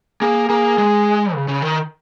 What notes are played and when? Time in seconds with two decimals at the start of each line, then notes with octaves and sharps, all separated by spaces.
0.21 A#3 G#4
0.49 A#3 G#4
0.78 G#3
1.34 C#3
1.48 C#3
1.62 D#3